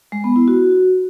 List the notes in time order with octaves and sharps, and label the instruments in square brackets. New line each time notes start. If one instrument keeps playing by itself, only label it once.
[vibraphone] G#3
B3
E4
F#4